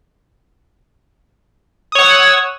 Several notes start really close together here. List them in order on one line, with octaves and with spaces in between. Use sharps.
D#6 C#5 F#5 E6